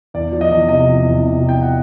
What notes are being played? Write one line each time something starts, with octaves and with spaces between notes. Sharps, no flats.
E2 D5
F3
D#5
E2
C3 D#5
F3
E2
C3
F3
G5
F#5